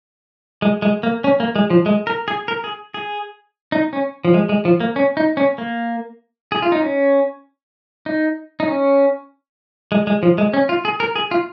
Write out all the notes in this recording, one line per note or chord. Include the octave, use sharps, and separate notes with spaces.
G#3
G#3
A#3
C#4
A#3
G#3
F3
G#3
A#4
G#4
A#4
G#4
G#4
D#4
C#4
F3
G#3
G#3
F3
A#3
C#4
D#4
C#4
A#3
G#4
F4
D#4
C#4
D#4
D#4
C#4
G#3
G#3
F3
G#3
C#4
F4
G#4
A#4
G#4
F4